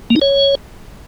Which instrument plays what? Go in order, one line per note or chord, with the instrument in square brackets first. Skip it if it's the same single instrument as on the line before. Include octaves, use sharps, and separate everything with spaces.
[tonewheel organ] A#3
D#4
C#5